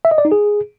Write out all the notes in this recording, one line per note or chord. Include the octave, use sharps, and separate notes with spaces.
E5
D#5
D5
D#4
G#4